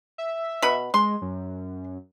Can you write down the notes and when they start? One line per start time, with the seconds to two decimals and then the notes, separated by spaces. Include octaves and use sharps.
0.18 E5
0.62 B2 B5
0.94 G#3 C6
1.22 F#2